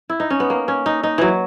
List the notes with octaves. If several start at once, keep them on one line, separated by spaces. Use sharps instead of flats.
E4
D#4
C#4
B3
A#3
C#4
D#4
D#4
E3 F#3